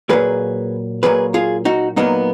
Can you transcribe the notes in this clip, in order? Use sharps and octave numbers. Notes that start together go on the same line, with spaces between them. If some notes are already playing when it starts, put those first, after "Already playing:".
A#2 F#3 A#3 G#4 B4
A#2 F#3 A#3 G#4 B4
F4 G#4
D#4 F#4
A#2 F#3 A#3 B3 D#4